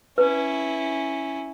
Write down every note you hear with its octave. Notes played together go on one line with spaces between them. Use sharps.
C#4 E4 B4